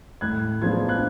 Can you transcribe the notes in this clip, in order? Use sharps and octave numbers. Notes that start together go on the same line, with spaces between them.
A2 F#6 G#6
F3 G#3 B3 D4 G#6
F#6 G#6